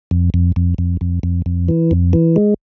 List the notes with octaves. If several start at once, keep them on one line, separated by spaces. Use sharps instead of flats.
F2
F2
F2
F2
F2
F2
F2
E3
F2
E3
G#3